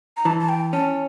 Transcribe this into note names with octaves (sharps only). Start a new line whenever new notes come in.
A#5
E3 A5
A5
G5
C#4 A5